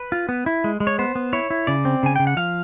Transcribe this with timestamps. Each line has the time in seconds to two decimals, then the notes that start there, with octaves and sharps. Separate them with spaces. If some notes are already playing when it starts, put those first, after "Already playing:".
Already playing: B4
0.12 F4
0.29 B3
0.46 E4
0.64 G#3
0.80 G#3
0.87 C#5
0.99 B3 C5
1.15 B3
1.33 E4 C#5
1.50 E4
1.67 C#3 D5
1.85 C4
2.03 C#3 G#5
2.16 C#3 G5
2.27 F#5
2.37 F3 F5